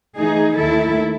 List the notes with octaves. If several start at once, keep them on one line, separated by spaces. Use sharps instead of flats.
E3 A3 D#4 G#4
D#2 D#3 A3 E4 A4